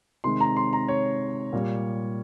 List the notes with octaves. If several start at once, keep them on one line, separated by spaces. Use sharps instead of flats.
C3 D#3 G#3 C6
A#5
C6
A#5
C#5
A#2 G3